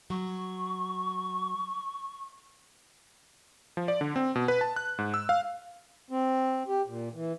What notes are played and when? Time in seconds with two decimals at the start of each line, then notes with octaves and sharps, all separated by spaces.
0.10 F#3 C#6
3.77 F3
3.88 D5
4.01 D3
4.16 C4
4.35 B2
4.48 B4
4.61 A5
4.76 F#6
4.98 G#2
5.14 E6
5.29 F5
6.10 C4
6.68 G4
6.87 A#2
7.14 E3